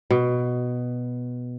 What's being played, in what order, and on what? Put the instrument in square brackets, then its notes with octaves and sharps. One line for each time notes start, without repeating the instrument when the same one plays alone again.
[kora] B2